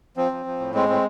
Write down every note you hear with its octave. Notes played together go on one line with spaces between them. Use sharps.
F3 C4
F3
F3
A2
G#3 C4
A2 C4